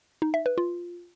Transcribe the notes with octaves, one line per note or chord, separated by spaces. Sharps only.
D#4
E5
B4
F4